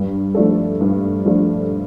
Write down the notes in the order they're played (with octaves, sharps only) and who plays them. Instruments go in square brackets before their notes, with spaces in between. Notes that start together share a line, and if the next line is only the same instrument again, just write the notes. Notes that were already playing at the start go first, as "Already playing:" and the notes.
Already playing: [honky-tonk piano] G2
F3 A3 D4 A4
G2
F3 A3 D4 A4